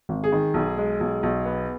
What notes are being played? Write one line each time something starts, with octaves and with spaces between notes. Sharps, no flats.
G#1
G#4
D#3
B1
G#3
B1
B1
B3